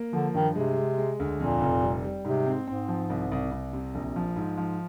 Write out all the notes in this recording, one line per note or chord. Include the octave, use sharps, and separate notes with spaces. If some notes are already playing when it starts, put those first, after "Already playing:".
Already playing: A#3
D3 F3
G2 D#3
C3 G#3
G#3
G#3
D2
F2 A#2
F1
G3
G3
G#2 C3
C4
G#2 C4
F3
C2
C2
C2
C3
A#1
F3
G#2
F3